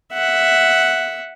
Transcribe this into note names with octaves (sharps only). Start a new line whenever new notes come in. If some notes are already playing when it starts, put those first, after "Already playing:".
E5 F#5